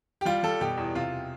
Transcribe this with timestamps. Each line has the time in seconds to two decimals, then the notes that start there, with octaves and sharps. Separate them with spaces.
0.21 G4
0.25 G3 F4
0.43 G3 A4
0.61 B2 G4
0.77 E2
0.95 C3 F4